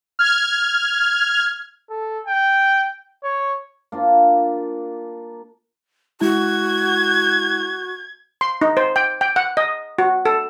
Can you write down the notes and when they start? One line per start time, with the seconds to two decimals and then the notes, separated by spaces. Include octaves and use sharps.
0.19 F6 G#6
1.90 A4
2.27 G5
3.24 C#5
3.92 A#3 D4 F4
6.21 G#3 E4 F#4 G#6
8.41 C6
8.61 D#4
8.77 C5
8.96 G5
9.21 G5
9.36 F#5
9.57 D#5
9.98 F#4
10.25 A4